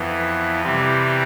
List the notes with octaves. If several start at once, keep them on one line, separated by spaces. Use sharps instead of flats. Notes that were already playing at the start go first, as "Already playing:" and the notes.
Already playing: F2 E3 B3
C3 E3 G3 C4